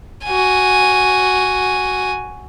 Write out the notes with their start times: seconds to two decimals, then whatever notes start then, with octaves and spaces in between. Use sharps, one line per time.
0.25 F#4 G#5